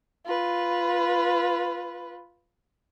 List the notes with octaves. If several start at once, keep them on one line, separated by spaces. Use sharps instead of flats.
F4 B4